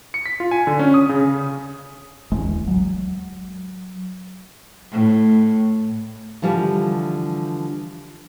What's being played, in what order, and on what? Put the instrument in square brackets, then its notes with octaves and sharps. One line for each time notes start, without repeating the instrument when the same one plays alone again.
[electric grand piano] C#7
B6
F4
G#5
D3
C#4
D#6
C#3
[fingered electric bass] D1 A1 E2 G#3
F#3
[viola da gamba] A2
[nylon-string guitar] D3 E3 F3 G3